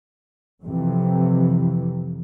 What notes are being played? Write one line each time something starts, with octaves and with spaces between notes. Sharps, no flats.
F2 C3 E3